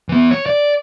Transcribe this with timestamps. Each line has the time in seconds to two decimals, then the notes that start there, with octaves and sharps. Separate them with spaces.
0.09 E3 B3
0.31 C#5
0.46 D5